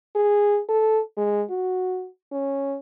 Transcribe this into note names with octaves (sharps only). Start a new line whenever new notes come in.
G#4
A4
G#3
F#4
C#4